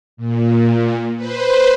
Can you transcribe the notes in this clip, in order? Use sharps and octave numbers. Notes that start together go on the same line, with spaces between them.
A#2
B4 C5